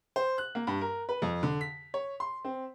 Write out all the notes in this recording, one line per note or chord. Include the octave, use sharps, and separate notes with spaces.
C5
F#6
A#3
G2
A#4
B4
F2
D3
B6
C#5
C6
C4